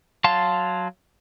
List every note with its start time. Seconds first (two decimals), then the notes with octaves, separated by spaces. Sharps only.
0.24 F#3 F5 A5 C6